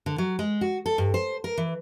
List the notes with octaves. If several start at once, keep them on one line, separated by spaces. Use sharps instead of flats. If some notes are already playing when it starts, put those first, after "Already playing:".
D3
F#3
G#3
F#4
A4
G2
C5
A#4
E3